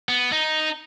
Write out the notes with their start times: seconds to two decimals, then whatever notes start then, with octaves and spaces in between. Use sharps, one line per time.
0.09 B3
0.32 D#4